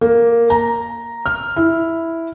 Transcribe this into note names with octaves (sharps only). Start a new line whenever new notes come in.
A#3
A#5
F6
E4